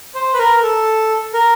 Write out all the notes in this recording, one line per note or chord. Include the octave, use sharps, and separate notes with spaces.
C5
B4
A#4
A4
A#4